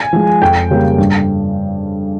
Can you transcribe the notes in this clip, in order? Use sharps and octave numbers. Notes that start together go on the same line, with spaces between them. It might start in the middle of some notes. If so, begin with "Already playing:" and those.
Already playing: G#5
F3 G#3
F2 G5
C#3 G3 A#3
G2